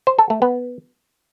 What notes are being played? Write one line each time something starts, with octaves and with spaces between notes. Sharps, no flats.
C5
A4
A3
B3